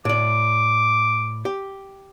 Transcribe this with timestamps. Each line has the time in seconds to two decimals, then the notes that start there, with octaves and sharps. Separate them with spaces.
0.05 A2 D5 D6
1.45 G4